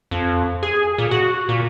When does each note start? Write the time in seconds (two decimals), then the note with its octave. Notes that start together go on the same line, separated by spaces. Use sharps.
0.11 F2
0.63 G#4
0.98 A#2
1.11 F#4
1.49 A#2